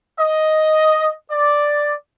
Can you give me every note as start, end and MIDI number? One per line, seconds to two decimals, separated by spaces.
0.19 1.11 75
1.31 1.92 74